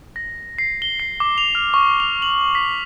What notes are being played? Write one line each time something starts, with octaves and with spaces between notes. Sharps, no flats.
A#6
C7
G7
C7
D6
F7
F6
C#6
F7
F#7
B6